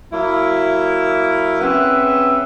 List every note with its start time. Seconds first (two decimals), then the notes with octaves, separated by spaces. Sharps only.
0.11 F#3 A#3 E4
1.60 C#3 C4 B4 E5 F#5